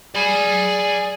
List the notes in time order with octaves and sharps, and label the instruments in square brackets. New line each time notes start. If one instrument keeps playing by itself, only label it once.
[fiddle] G#4 [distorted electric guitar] D5 B5